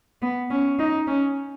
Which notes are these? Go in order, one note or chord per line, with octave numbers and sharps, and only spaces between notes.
B3
C#4
D#4
C#4